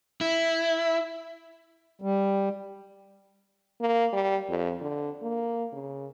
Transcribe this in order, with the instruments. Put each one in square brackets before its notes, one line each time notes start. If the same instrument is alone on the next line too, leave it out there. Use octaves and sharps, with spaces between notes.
[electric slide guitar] E4
[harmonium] G3
[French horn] A#3
G3
F2
D3
A#3
C#3